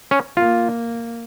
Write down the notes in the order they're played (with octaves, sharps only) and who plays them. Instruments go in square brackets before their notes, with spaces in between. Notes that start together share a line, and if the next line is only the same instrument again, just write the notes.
[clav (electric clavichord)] C#4
[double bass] A#3 [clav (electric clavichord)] F4